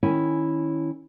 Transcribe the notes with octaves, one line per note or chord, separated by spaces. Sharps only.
D#3 C#4 E4 C#5 G#5